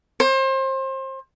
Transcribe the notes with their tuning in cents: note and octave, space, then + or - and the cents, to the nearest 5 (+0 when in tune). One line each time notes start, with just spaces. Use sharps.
C5 +30